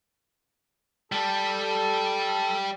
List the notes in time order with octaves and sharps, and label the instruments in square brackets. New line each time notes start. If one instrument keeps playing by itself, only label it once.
[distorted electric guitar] G3 [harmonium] A4